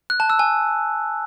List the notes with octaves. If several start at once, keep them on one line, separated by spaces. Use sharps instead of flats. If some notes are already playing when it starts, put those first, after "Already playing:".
F#6
A5
E6
G#5